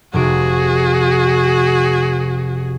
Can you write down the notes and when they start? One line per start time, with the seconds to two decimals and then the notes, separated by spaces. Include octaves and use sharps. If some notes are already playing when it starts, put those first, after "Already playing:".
0.13 F1 C3 F#4 G#4 D7